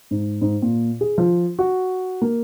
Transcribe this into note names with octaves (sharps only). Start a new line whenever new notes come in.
G#2
G#2
A#2
G#4
F3
F#4
A#3